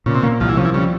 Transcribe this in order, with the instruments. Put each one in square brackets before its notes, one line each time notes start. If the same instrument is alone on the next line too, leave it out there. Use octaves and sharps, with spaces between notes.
[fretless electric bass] A#2 [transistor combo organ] C#3
[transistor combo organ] C3
[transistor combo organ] C#3 [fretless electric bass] A#3
[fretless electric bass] C2 [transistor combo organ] F3
[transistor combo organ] E3
[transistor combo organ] C#3 [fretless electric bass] F3
[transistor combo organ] E3
[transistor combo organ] C#3 [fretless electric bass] G3